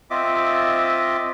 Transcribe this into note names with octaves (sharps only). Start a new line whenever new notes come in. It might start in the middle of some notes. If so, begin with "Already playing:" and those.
C4 F4 D#5 E5 D6